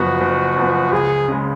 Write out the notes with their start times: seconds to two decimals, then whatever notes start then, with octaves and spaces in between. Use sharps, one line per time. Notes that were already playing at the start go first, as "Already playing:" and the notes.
Already playing: F#1 F#2 F3 B3 F#4
0.21 F#1
0.56 F#2 F3 B3
0.92 C#2 G#4
1.28 C#3 G#3